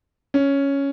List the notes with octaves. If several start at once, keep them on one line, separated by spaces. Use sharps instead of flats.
C#4